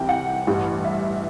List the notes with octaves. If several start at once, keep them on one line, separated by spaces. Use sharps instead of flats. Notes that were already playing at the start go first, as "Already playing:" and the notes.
Already playing: C2 C3 E3 G3 G5
F#5
A1 G2 E3 G3
E5